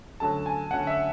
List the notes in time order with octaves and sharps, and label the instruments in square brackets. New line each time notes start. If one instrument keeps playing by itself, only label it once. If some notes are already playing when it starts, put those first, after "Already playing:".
[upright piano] D2 D3 F#3 A3 C#4 [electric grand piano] A5
[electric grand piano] G#5
[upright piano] D2 D3 F#3 A3 C#4 [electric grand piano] F#5
[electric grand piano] E5